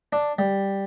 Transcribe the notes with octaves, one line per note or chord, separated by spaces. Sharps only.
D4
G3